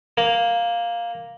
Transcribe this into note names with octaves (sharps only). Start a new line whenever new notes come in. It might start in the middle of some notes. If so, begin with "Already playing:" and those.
A#3